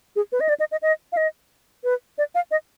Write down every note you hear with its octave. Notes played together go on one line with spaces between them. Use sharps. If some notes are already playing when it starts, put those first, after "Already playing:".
G#4
B4
D#5
D5
D#5
D#5
D#5
F5
D#5
B4
D5
F5
D#5